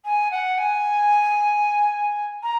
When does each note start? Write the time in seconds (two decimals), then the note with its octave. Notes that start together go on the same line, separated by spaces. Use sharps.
0.05 G#5
0.31 F#5
0.58 G#5
2.43 A#5